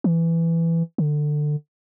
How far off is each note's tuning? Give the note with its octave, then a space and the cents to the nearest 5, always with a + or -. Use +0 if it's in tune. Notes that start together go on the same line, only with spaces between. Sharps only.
E3 +10
D3 +20